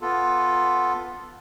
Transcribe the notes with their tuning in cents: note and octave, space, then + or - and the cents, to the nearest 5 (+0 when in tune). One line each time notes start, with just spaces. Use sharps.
B3 +0 F4 +5 A4 +0